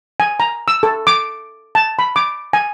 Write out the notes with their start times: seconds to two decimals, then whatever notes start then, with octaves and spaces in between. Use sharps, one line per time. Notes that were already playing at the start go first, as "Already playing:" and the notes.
0.20 G#5
0.40 A#5
0.68 E6
0.83 A4
1.07 D6
1.75 A5
1.99 B5
2.16 D6
2.53 G#5